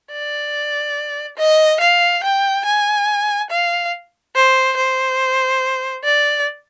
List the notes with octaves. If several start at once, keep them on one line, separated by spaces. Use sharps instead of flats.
D5
D#5
F5
G5
G#5
F5
C5
C5
D5